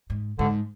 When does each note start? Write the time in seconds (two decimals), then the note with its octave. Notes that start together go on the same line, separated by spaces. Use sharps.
0.10 G#2
0.39 G#2 D3